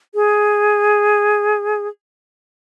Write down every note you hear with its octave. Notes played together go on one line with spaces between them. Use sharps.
G#4